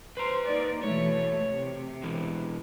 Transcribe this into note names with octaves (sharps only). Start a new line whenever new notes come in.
B4 C5 A#5
A#3 D#4 D5
B2 E3 A3 C#5
C3
B2 E3